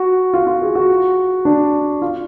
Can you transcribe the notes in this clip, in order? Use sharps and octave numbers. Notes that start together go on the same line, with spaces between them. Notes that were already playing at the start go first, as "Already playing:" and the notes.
Already playing: F#4
F4
F4
G#4
F#4
D4
F4